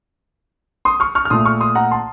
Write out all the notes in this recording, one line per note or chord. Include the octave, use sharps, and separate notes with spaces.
C6 D#6
C#6 F6
C#6 F6
F6
A#2 A3 C6 D#6
C#6 F6
C6 D#6
F#5 A#5
A5 C6